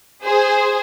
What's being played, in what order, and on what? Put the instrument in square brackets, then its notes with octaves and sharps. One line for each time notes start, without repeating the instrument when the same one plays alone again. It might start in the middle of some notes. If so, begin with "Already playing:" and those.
[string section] G#4 C5